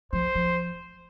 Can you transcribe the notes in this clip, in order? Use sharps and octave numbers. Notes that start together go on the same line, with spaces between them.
F3 C5
F3